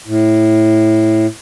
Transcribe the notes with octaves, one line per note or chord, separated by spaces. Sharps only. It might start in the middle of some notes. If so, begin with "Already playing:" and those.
A2